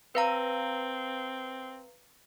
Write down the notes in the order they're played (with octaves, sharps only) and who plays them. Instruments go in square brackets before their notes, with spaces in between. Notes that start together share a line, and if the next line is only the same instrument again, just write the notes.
[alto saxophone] C4 [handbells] B4 F5 A#5